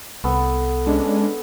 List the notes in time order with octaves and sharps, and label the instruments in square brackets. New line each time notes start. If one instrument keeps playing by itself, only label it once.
[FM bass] C2 [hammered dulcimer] B3 A4
[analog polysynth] G#3 C#4 D4